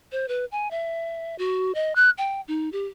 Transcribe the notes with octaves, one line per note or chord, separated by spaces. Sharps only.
C5
B4
G#5
E5
F#4
D#5
F#6
G5
D#4
G4